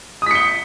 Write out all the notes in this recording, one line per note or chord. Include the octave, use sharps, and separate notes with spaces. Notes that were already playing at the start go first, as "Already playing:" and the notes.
D#6 B6 C#7 G7